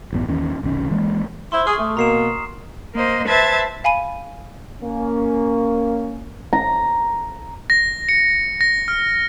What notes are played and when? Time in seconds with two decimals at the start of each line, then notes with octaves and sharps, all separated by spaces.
0.12 A1 F#2 B3
0.28 D#2 D#3 E3 C#4
0.63 F1 B1 D#3 C#4
0.91 E3 G#3 A#3
1.52 E4 C5 C6
1.67 G#4 C#6 D#6 F6
1.78 A3
1.97 B2 A#3 A#5 C7 E7
2.95 A#3 C5 D#5
3.28 B4 C5 E5 A5 G#6 A6
3.84 F5 G#5 B5 D#7
4.83 A#3 C#4
6.53 A#5
7.70 A#6
8.09 C#7
8.61 A#6
8.88 F6